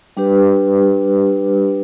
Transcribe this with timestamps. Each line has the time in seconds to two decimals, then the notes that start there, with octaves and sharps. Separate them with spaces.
0.17 G3 D4 G4 B4